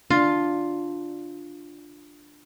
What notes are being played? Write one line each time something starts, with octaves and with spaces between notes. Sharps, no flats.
D4 F4